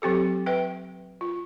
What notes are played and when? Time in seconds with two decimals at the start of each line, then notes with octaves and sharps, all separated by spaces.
0.02 F#3 C4 G4 A4
0.46 B4 E5 G5
1.21 F4